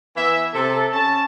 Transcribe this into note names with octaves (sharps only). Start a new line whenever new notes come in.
E3 B3 E5
C3 A4
C#4 A5